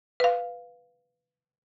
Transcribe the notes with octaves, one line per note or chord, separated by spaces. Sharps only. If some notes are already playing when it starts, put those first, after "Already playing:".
B4 F5